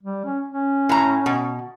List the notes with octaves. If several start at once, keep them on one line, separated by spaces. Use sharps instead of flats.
G3
C#4
C#4
A2 A#5
B2